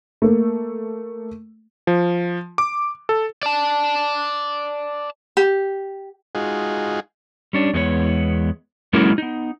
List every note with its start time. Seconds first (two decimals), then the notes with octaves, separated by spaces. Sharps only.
0.22 A3 A#3
1.87 F3
2.58 D6
3.09 A4
3.43 D5 A5
5.37 G4
6.35 G#3 D#4 F4 F#4 G#4
7.53 G3 C#4 D4
7.73 E2 G#3 B3 D4 C#5
8.93 F#3 G#3 A#3 C#4 E4 A#4
9.18 B3 D#4